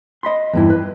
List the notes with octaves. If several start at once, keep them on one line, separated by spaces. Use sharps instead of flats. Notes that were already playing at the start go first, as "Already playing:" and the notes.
D#5 B5 C6
E2 G2 E4
B4